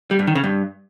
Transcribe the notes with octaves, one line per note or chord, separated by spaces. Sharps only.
G3
G2
D#3
C#3
G2